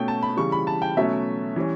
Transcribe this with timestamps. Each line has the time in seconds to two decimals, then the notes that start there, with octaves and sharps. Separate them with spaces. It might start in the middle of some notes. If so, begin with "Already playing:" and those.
Already playing: B2 A3 C#4 G5
0.08 A5
0.23 B5
0.37 C#3 E3 G3 C#6
0.52 B5
0.67 A5
0.82 G5
0.97 B2 F#3 A3 C#4 E5
1.56 E3 G3 C#4